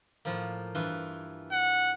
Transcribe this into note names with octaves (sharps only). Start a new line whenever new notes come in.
A2 F3 A#3
G2 E3 F4
F#5